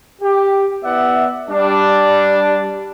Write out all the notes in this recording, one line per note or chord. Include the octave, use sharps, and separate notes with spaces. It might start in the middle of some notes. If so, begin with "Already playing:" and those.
G4
B3 E4 D5 E5 F#5
G3 D4